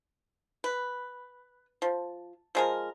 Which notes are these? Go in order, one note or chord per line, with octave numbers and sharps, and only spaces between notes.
B4
F3
F3 G#3 A#4